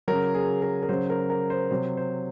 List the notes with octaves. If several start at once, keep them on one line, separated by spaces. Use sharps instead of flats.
C#3 F#3 A#4
G#4
A#4
A#4
C#3 F#3 C5
A#4
A#4
C5
C3 F#3 C5
C5